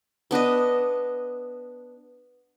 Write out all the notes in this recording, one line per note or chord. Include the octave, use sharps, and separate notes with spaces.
B3 D4 B4 D#5